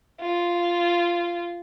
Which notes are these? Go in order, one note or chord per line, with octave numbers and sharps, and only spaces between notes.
F4